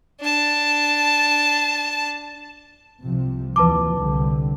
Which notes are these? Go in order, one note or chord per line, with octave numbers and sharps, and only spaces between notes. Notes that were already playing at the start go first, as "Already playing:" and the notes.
D4 A5
C2 C3 F3
D#2 E3 F3 B4 A5 D6
C2 D3 G3